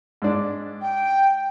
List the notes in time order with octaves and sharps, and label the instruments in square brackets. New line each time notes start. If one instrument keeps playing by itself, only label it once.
[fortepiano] G#2 D4
[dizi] G5